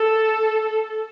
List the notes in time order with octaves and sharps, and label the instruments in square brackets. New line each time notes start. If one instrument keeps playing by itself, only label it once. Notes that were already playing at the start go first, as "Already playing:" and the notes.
Already playing: [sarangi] A4